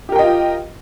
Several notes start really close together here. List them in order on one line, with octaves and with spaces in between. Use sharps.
G4 A#4 G5 D#5 F4